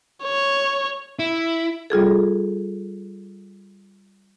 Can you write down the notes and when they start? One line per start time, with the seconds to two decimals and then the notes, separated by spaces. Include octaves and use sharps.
0.23 C#5
1.19 E4
1.90 G3 F4 G#4 A4